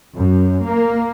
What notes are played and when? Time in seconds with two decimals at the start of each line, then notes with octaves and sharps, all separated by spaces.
0.16 F#2
0.67 A#3